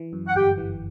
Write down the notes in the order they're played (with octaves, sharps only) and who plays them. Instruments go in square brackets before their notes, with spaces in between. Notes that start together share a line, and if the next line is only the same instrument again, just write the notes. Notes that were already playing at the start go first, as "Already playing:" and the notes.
Already playing: [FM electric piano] E3
F#2
[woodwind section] F#5
[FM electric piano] G1 [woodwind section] G4 G5
[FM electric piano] E3